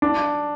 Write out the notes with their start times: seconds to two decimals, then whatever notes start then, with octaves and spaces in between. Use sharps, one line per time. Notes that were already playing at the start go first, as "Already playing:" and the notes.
0.02 D4